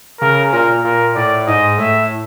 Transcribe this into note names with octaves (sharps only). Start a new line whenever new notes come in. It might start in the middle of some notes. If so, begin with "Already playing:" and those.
C#3 A#4
A#2 A#4
A#2 A#4
A2 D5
G#2 D#5
A2 E5